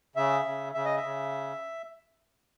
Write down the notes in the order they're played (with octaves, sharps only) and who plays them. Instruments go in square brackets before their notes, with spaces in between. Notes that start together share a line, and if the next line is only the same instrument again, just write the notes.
[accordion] C#3 E5
C#3
C#3 E5
D#5
E5
C#3